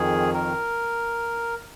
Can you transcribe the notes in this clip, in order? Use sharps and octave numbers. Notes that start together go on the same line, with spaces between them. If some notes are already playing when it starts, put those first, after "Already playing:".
Already playing: F2 D#3 G#4
A#4